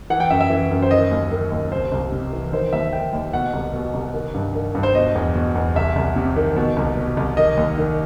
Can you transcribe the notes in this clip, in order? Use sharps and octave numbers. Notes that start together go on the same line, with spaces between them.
E3 F#5
G5
F#2 E5
E5
E3
F#2
C5
D#3 D#5
D#2
D#3
D#2
C2 C5
C2
C3
E3
D#3 C5
D#2 E5
D#3 G5
D#2
B2 F#5
C2
B2
C2
D#3
G2
D#3
G2
C5
B2 D#5
E2
B2
E2
C2 E5
C2
C3
D#3
B2
C2
B2
C2
D#3 D#5
D#2
D#3